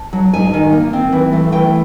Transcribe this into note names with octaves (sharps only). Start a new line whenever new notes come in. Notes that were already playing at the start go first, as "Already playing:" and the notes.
Already playing: A5
F#3
G#2 G#5
D#3
A#3
C4
E3
A3
E3 G5